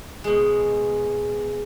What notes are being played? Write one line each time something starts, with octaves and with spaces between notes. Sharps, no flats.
B2 G#3